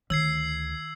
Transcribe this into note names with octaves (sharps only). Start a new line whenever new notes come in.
D2 D#3 E6 G#6 C7